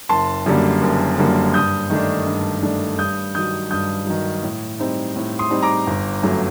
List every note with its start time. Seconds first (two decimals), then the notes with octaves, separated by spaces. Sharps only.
0.09 F#1 A5 C6
0.46 F#2 D3 G3 A#3
0.82 F#1
1.19 F#2 D3 G3 A#3
1.54 G2 D#6 G6
1.90 D#3 A3 D4
2.26 G2
2.63 D#3 A3 D4
2.98 G2 D#6 G6
3.35 D#3 F#3 D#6 G6
3.71 G2 D#6 G6
4.07 D#3 F#3
4.43 A2
4.79 G3 C4 D#4
5.16 A2
5.39 C6 D#6
5.51 G3 C4 D#4
5.63 A#5 D6
5.87 G1
6.23 F#2 F#3 A3